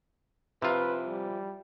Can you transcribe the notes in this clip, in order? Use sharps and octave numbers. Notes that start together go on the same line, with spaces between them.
C3 F3 E4 F4 B4
G3